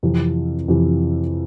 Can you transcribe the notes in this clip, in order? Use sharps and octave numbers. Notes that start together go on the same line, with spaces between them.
F2 C3 E3
F2 C3 E3